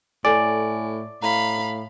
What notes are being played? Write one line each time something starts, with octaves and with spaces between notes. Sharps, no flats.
A2 A4 D5 G#5
A2 F5 A#5 B5